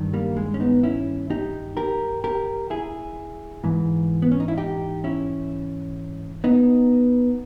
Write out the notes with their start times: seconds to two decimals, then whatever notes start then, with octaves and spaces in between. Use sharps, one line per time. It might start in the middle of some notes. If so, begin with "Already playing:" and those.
Already playing: G2 D#3
0.14 G3 A#3
0.37 G#3
0.54 C#4
0.60 B3 D#4
0.83 C#4 E4
1.30 D#4 G4
1.77 G4 A#4
2.24 G4 A#4
2.70 E4 G#4
3.64 G#2 E3
4.22 B3
4.32 C#4
4.40 D#4
4.48 E4
4.57 D#4 G4
5.04 C#4 E4
6.44 B3 D#4